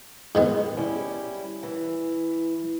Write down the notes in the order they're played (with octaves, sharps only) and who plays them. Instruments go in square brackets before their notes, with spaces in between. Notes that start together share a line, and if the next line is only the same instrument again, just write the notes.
[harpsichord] G#2 D#3 B3
[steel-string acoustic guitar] G3 C#4 E4
E3